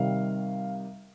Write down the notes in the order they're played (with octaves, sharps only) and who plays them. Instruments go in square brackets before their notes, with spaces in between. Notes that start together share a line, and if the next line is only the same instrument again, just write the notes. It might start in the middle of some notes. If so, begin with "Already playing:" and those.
Already playing: [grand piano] C3 D#3 G3 F5